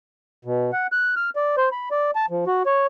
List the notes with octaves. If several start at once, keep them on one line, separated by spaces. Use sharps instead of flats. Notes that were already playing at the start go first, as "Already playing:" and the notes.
B2
F#5
F#6
F6
D5
C5
B5
D5
A5
F3
F#4
C#5